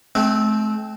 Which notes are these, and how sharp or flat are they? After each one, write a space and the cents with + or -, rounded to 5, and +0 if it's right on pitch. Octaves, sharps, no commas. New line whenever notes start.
A3 -40 C4 +0